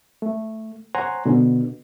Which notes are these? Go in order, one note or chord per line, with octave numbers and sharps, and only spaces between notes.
A3
C5 C#5 F#5 G#5 A#5 C6
B2 D3